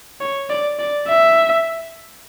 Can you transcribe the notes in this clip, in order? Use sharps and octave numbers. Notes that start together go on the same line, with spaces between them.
C#5
D5
D5
E5